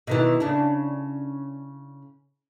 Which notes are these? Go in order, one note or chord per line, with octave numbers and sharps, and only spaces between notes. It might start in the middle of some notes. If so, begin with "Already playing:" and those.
B2 D#3 E3
C#3 D4